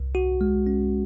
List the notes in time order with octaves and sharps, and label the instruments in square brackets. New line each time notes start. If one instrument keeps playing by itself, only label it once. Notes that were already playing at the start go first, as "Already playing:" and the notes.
Already playing: [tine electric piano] C2
F#4
G#3
C#4